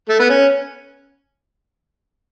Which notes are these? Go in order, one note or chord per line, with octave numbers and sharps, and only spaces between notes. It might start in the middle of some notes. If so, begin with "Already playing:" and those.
A3
B3
C#4